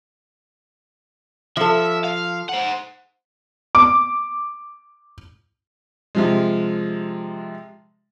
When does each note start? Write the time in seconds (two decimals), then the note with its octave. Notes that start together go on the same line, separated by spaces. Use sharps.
1.57 F3 A4 E5
2.04 F5
2.49 C5 F#5
3.75 D6
6.15 C3 F3 G#3